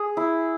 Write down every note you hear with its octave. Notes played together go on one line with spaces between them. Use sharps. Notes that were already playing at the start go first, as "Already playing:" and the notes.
Already playing: G#4
E4